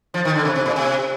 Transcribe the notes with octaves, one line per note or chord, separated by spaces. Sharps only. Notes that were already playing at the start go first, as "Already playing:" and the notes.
F3
D#3
D3
C3
C3
A#2
C3